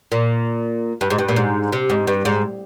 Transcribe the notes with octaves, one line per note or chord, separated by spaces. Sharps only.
A#2
G2
G#2
G2
A#2
G#2
C3
G#2
G2
G#2